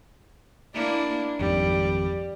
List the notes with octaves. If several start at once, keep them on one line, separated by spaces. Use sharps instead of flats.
A#3 D4 E4
G#1 F2 D#3 G3